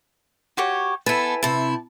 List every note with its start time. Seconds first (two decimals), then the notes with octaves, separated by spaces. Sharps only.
0.57 F#4 G4 C#5
1.06 B3 E4 A4 G#5 A5
1.43 C3 E4 A5